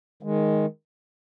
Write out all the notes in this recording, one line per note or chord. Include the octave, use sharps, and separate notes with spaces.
D#3 G#3